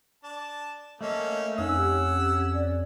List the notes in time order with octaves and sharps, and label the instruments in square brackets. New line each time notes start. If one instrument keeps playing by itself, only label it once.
[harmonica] D4 A5
[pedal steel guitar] A3 [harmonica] A#3 C#4 [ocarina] D#5
[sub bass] F2 [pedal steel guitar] C#4 [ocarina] D#4 [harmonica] F#5 E6
[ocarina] G4
D5